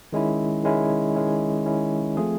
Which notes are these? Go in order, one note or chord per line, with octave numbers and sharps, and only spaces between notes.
D#3 G#3 C#4 E4
D#3 G#3 C#4 E4
D#3 G#3 C#4 E4
D#3 G#3 C#4 E4
F3 A3 C4 F4 G#4